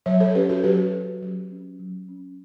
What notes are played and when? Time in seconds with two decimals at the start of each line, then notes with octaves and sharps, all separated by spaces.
0.06 F#3 C#5 E5
0.20 A4 C#5
0.35 C#4 G4 B4
0.49 F#4 A4
0.64 F#3 G4 B4
0.93 C#4
1.22 F#3
1.50 C#4
1.80 F#3
2.09 C#4